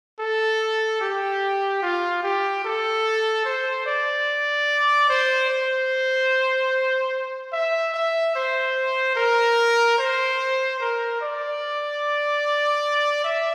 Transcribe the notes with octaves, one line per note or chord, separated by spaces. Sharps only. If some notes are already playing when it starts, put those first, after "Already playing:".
A4
G4
F4
G4
A4
C5
D5
C5
C5
E5
E5
C5
A#4
C5
A#4
D5
E5